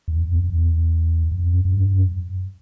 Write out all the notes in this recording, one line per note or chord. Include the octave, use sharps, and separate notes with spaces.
E2
F2
F2
E2
F2
F#2
F#2
G2
F#2